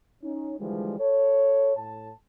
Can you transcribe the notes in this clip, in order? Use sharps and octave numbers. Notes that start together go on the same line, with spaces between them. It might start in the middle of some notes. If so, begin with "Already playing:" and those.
C#4 D#4
D3 E3 F3 G3 G#3
A4 C#5
A2 A5